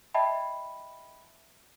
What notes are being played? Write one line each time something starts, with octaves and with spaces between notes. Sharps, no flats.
D#5 E5 G5 A5 B5